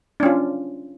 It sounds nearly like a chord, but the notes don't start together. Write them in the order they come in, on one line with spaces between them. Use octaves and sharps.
D4 C#4 F4